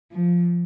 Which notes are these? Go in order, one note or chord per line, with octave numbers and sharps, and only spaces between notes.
F3